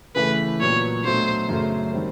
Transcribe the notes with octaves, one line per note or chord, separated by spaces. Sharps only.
C#3 E3 A3 B4
A#2 F#3 B3 C#5
B2 F#3 A3 D4 C5
F#2 C#3 F#3 A3
D#3 G3 C4